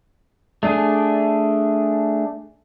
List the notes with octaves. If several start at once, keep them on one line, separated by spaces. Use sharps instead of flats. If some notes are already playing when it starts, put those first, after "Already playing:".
A3 D4 G#4